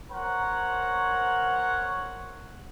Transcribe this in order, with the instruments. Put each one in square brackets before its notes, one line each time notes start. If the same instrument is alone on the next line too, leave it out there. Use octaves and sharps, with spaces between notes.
[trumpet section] A#4 C5 C#5 F#5